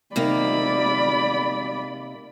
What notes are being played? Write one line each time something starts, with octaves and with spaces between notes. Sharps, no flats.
C3 A#3 D#4 D5 B5